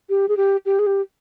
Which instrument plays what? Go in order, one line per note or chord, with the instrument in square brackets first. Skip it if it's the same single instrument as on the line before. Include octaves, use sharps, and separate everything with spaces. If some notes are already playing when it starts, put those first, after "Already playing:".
[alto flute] G4
G#4
G4
G4
G#4
G4